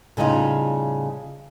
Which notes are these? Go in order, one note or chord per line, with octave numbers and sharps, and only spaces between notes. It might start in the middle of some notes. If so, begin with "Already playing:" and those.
A2 C#3 G3 D#4 F4